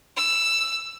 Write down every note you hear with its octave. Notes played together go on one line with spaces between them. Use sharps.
E6